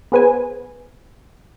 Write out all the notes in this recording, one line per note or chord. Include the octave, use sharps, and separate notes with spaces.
B3 G#4 B4 C5 G#5